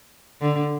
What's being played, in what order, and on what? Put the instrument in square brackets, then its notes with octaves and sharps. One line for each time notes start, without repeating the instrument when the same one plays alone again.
[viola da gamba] D3